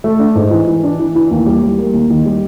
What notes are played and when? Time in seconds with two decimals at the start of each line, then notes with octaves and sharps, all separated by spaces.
0.04 A3
0.19 D4
0.35 G#2
0.51 E3
0.67 E3
0.83 D4
0.99 E3
1.15 E3
1.31 D#2
1.46 G3
1.63 G3
1.78 A#3
1.94 D#2
2.10 D#3
2.26 G3